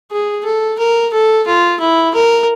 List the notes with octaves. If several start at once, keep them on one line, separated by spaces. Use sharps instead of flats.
G#4
A4
A#4
A4
F4
E4
A#4